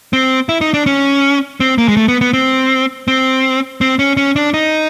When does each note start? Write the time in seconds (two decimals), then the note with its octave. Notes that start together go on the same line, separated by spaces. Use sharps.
0.13 C4
0.49 E4
0.61 D#4
0.74 D4
0.86 C#4
1.60 C4
1.78 A#3
1.88 G#3
1.97 A3
2.08 B3
2.21 B3
2.33 C4
3.08 C4
3.81 C4
3.99 C#4
4.17 C#4
4.36 D4
4.54 D#4